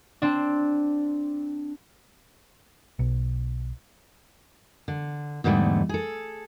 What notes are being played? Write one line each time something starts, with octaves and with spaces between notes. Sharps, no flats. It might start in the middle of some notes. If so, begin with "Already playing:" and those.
C4 D4
B1
D3
E2 G#2 D3 G3 A3
G#4 A4